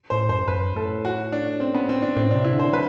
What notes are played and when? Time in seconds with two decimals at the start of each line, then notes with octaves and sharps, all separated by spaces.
0.10 A2 C5
0.29 F#2 C5
0.48 F#2 B4
0.76 A2 A4
1.05 F#4
1.32 D4
1.60 C4
1.74 B3
1.89 C4
2.02 D4
2.16 A2 C4
2.31 C3 D4
2.44 E4
2.54 D3
2.59 C5
2.73 F#3 B4